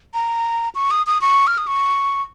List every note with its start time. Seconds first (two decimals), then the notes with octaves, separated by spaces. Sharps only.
0.14 A#5
0.75 C#6
0.91 D#6
1.07 D#6
1.21 C#6
1.47 F6
1.58 D#6
1.67 C#6